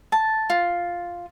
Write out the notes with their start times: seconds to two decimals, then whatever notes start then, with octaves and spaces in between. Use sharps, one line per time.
0.12 A5
0.50 F4